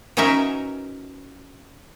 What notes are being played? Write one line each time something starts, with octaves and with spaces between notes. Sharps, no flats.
E3 F#3 C#4 D#4 A#4 E5